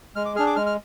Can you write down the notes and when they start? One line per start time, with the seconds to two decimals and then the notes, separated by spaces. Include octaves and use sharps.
0.16 G#3 F6
0.25 D6
0.36 D4 G#4 F6
0.47 D6
0.56 G#3 F6
0.66 F6